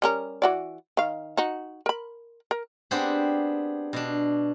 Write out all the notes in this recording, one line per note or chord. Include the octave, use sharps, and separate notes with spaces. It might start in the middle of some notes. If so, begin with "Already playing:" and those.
G3 C#4 A#4
E3 F#4 D5
D#3 F5
D#4 F#4
A#4 B5
A#4
B3 C4 D4 G4 G#4 C5
B2 D4